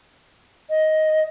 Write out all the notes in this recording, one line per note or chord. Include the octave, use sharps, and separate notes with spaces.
D#5